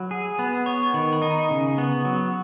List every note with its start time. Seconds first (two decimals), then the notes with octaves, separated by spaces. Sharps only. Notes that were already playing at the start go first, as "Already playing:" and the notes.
Already playing: F#3 B5
0.11 G#4
0.39 B3 B5
0.66 C#5 C#6
0.83 C#6
0.94 D#3 B5
1.13 B5
1.22 D#4 C#6
1.50 C#3 C#6
1.78 B3
2.05 F#3